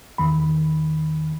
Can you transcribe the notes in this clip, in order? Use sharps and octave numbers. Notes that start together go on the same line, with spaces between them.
E2 D#3 B5